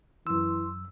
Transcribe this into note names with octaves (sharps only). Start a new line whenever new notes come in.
F#2 E3 C6 E6